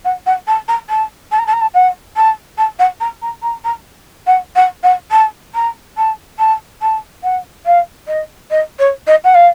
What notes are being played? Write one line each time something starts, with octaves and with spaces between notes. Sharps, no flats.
F#5
F#5
A5
A#5
A5
A5
A#5
A5
A#5
A5
F#5
A5
A5
F#5
A#5
A#5
A#5
A#5
F#5
F#5
F#5
A5
A#5
A5
A5
A5
F#5
F5
D#5
D#5
C#5
D#5
F#5
F5